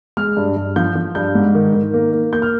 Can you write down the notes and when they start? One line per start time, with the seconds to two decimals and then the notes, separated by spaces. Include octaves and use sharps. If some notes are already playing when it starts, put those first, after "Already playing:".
0.17 G#3 F6
0.37 G2
0.56 G2
0.76 F3 G6
0.95 F3
1.15 G2 G6
1.35 G#2
1.55 D#3
1.74 D#3
1.94 A#3
2.13 A#3
2.33 A#3 G6
2.42 F6